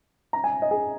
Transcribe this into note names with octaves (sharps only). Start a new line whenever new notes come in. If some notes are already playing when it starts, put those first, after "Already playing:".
A#5
G#5
D#5
G#4